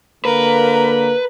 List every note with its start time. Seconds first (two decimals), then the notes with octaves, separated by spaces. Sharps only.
0.25 D3 A#3 A#4 B4